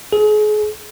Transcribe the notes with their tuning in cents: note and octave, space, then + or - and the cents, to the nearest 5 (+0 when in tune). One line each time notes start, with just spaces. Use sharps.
G#4 +35